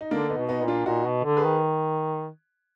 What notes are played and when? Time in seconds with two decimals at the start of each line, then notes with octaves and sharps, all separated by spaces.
0.01 D#4
0.11 D3 A#3 D4
0.29 B3 D#4
0.37 B2
0.49 B3 D#4
0.61 A#2
0.68 D4 F4
0.86 A#2 D#4 F#4
1.06 B2
1.24 D3
1.37 G#4 B4
1.44 D#3